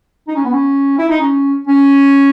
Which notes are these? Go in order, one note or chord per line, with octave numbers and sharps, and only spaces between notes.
D#4
C#4
B3
C#4
E4
D#4
C#4
C#4